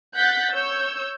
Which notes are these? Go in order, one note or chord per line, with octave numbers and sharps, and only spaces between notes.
F#5 F#6 G6 A6 B6
C#5 E6 G6